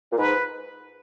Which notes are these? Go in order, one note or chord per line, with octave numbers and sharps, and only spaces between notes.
A#2
G#2 B4